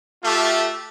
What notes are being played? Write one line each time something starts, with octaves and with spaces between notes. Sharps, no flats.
A3 F4 G4 A4 E5